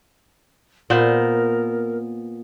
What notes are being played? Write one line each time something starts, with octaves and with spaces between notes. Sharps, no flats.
A#2 B3 A#4 C5